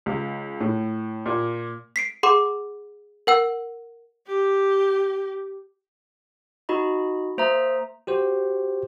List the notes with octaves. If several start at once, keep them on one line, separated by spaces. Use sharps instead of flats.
C#2
A2
A#2
B6 C7 D7
G#4 F#5 C6 D6
A#4 F#5 E6
G4
D#4 F#4 D#5 B5
A#3 C5 E5 A#5 D#6
F#4 G4 C5